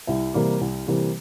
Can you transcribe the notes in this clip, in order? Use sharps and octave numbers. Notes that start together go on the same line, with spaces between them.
C2 E4 E5
C3 E3 G3 A#3
C2
C3 E3 G3 A#3